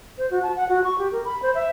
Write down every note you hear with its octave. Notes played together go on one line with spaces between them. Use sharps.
C5
F#4
A5
F#5
F#4
C#6
G4
A#4
B5
C5
E5